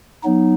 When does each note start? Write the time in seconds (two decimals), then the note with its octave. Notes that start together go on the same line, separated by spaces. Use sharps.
0.23 F#3 B3 D#4